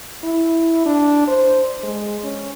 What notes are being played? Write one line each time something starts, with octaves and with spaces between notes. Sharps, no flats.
E4
D4
C5
G#3
C#4